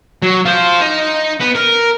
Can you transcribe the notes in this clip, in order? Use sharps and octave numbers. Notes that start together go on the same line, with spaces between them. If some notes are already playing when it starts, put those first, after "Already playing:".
F#3
F4 C5
D#4
B3
A#4